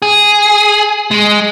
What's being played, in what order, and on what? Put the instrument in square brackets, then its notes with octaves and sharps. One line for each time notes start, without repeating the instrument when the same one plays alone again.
[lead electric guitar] G#4
G#3